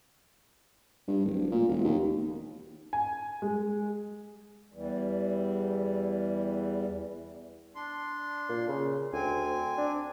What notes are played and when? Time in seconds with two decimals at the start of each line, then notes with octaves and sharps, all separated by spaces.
1.08 G2
1.25 D1
1.51 A#2
1.69 E1
1.84 D#2
2.93 G#5
3.42 G#3
4.74 E2 E3 G3
7.75 D4 C6
8.49 A#2
8.69 C#3
9.13 D2 C4 G#5
9.78 D4